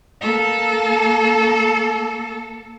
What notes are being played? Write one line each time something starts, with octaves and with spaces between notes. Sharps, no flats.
A#3 A4